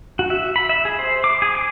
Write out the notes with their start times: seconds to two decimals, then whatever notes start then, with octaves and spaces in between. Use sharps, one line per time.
0.19 F#4
0.30 E5
0.56 B5
0.69 E5
0.85 G#4
0.99 C5
1.24 D6
1.42 G#4
1.57 D6